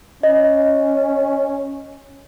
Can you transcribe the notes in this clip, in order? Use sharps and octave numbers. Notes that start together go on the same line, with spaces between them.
C#4 D#5